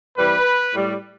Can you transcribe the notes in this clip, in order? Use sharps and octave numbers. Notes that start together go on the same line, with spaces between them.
C3 E3 G3 B4
A2 G3